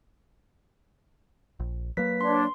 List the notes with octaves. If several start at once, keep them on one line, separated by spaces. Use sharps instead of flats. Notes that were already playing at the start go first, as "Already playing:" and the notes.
A#1
F#3 A#3 B4 B6
D4 C#5 C6